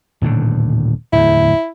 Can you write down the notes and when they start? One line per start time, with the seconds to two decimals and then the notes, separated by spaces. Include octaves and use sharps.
0.22 D#1 A2 D3
1.13 D1 E2 E4